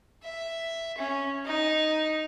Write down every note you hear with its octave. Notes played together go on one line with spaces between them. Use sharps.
E5
C#4
D#4